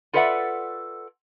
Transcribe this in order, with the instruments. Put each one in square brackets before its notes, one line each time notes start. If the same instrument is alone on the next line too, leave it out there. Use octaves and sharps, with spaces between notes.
[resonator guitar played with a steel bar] F4 A4 B4 D5 E5 F#5